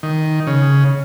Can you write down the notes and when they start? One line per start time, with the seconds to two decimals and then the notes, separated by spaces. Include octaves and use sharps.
0.03 D#3
0.47 C#3